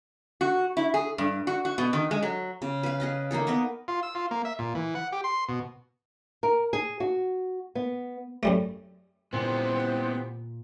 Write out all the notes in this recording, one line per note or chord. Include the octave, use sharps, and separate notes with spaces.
F#4
E4
G#4
G2
F#4
F#4
B2
D#3
G#3
F#3
C#3
B4 F5
G#4 D#5 A5
A#3 D#4 G#4 A4
B3 A#4 B4 D#5
F4
E6
F4
A#3
E5
A#2
E3
F#5
G4
C6
B2
A#4
G#4
F#4
B3
F#2 G3 A3
A#2 E3 B3 C4 G4 C5